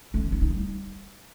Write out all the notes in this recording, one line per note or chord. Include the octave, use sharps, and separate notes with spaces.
A3
D4
E4
D#4
G3